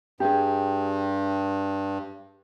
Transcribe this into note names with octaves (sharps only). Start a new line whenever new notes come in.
G2 G4 G#4